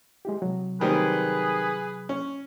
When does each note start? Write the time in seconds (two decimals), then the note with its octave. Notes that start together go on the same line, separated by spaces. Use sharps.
0.25 G#3 E4 G4
0.42 C3 F#3
0.81 D#3 G3 C4 G#4 B4
2.09 C#4